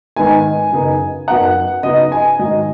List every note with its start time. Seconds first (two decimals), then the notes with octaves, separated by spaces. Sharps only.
0.16 G#2 D#3 B3 D#4 G#5
0.72 F#2 C#3 B3 D#4
1.28 F#2 F#3 B3 D#4 F#5
1.83 C#3 F#3 B3 D#4 D#5
2.12 G#5
2.39 G#2 D#3 F#3 D#4 D#5